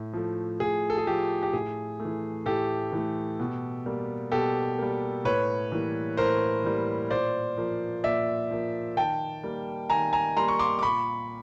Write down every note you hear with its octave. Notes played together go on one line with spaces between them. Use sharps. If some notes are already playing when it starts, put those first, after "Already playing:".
Already playing: A2
F3 A3
A2 G#4
A4
G#4
F3 A3 G4
G4
A2 G#4
A3
E3
A2 G4 A4
E3 A3
B2
G3 A#3
B2 G4 A4
G3 A#3
A2 B4 C#5
E3 G3 A#3
A2 A#4 C5
E3 G3 A#3
A#2 C5 D5
F3 A#3
A#2 D5 E5
F3 A#3
D#3 G5 A5
G3 A#3
D#3 G#5 A#5
G#5 A#5
G3 A#3 A#5 C6
C#6
C6 D6
D6
A#2 B5 C#6